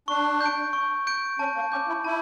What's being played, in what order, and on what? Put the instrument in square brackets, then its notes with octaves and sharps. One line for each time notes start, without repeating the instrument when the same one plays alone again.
[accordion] D4 [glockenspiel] C#6
[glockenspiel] G6 D7
C#6
G6 D7
[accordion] C#4 [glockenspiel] A5
[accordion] A#3
[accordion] C#4 [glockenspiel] D6 G6
[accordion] E4
[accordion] E4 [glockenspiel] A5